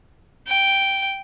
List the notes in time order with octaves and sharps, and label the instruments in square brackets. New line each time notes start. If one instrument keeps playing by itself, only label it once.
[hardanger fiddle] G5